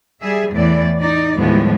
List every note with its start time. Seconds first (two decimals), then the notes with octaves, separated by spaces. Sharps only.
0.20 G3 G#4 E5
0.51 E2 A2 E3 D5
0.98 D#4 D5
1.36 D#2 A2 F3 G3 G#3 B3